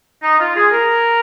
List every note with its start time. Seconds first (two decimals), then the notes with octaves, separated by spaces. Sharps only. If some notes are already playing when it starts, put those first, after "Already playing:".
0.23 D#4
0.40 F4
0.56 G#4
0.72 A#4